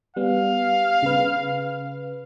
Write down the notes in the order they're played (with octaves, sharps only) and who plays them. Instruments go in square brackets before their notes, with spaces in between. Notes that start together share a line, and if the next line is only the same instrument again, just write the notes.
[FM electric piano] G3 B3 [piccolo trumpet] F5
[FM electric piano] C#3 B4